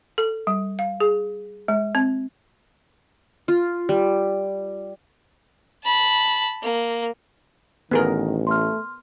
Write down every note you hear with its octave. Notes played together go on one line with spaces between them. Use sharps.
A4
G3
F5
G#4
G#3
C4
F4
G3
A5 B5
A#3
A1 D#3 B3 G#4 A#4
A3 C6 F6